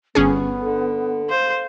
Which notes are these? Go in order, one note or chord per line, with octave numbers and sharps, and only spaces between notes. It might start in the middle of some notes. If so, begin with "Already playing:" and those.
G1 B3 C#4 G#4
D3
C5 F5